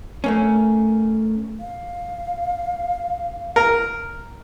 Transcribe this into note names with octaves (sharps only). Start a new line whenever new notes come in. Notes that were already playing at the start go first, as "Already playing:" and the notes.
A3 A#3 C#4
F5
A#4